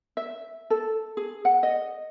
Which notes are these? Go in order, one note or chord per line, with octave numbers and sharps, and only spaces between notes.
E5
A4
G#4
F#5
D#5